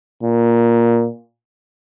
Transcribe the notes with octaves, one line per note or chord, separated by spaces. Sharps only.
A#2